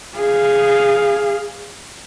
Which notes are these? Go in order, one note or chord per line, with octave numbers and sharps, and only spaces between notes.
G#4 F5